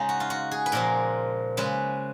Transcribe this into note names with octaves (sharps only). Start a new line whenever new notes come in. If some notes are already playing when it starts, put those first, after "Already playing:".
Already playing: C#3 G#3 D#4
F#4
F4
F#4
G#4
B4
A#2 F3 G#3 A#4
C#3 G#3 B4